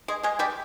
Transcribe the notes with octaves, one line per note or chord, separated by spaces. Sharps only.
G#3 G#4
G#3 G#4
G3 G4